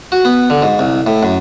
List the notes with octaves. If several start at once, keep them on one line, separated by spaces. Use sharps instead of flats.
F#4
B3
D3
G#2
C2
A2
F#2